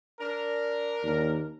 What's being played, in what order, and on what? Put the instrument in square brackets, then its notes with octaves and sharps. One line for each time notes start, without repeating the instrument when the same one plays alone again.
[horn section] D4 A#4
[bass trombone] D#2